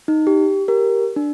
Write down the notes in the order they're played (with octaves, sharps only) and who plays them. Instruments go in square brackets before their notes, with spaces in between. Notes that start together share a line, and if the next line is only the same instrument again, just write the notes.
[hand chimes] D#4
G4
G4 A#4
D4